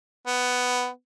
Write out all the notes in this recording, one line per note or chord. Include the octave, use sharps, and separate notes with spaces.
B3